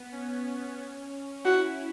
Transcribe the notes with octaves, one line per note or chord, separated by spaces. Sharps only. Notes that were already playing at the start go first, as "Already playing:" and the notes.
Already playing: B3
C#4
E4 F#4